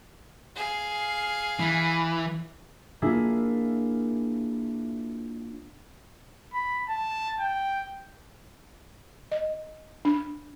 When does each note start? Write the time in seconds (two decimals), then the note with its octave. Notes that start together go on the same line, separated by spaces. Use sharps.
0.56 G#4 F5
1.60 E3
3.02 A#3 D4 E4 F4 G#4
6.53 B5
6.89 A5
7.40 G5
9.32 D#5
10.05 D4